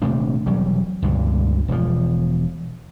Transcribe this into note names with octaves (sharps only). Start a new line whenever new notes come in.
D#1 C3 A3 D4
E1 F#3 G3
C#2 G2 B2 D3
E1 E2 F3